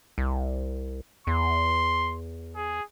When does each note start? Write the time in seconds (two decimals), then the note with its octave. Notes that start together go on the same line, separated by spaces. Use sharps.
0.18 C2
1.27 E2 C6
2.55 G#4